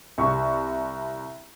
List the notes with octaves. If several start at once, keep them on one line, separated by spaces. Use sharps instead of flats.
C2 C#6